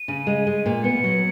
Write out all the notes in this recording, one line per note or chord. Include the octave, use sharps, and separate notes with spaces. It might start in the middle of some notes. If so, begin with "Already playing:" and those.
Already playing: D#7
C#3
G#3
G#3
A#2
B3 C#7
F#3